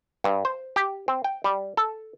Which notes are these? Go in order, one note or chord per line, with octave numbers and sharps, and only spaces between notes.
G2
C5
G4
C4
G5
G3
A4